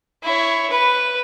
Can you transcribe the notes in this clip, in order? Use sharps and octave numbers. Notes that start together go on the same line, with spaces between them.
E4 C#5
B4